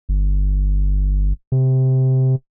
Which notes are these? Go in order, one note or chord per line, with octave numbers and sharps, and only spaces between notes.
G1
C3